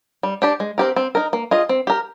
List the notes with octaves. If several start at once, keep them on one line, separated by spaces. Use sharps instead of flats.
G3
D4 G4 D5
G#3
C4 G4 A#4
C4
D#4 A#4
A#3
F4 G#4 D#5
C4
G4 A#4